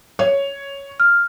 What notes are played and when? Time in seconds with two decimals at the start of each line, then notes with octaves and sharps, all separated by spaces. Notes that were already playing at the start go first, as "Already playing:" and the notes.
0.19 C#5
1.00 F6